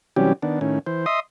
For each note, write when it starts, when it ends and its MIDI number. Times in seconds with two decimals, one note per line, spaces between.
0.16 0.33 48
0.16 0.33 52
0.16 0.33 54
0.16 0.33 55
0.16 0.33 61
0.16 0.33 67
0.42 0.60 51
0.42 0.60 59
0.42 0.60 62
0.61 0.79 45
0.61 0.79 51
0.61 0.79 61
0.87 1.06 52
0.87 1.06 72
1.06 1.20 75
1.06 1.20 76
1.06 1.20 84
1.06 1.20 87